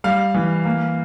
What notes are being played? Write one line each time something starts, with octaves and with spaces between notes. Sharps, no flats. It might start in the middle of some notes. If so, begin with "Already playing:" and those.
G3 F5
E3
A#3